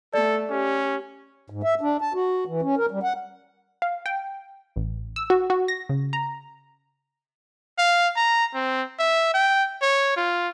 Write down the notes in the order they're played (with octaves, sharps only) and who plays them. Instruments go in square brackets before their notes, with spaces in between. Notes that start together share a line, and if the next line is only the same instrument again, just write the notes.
[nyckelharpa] A3 [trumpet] A4 [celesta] D5
[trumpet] C#4 [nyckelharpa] G4
[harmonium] G#2
E5
D4
A5
F#4
E3
C#4
A#4
G3
F#5
[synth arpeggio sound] F5
G5
A1
E6
F#4
F#4
A#6
C#3
A#5
[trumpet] F5
A#5
C4
E5
G5
C#5
F4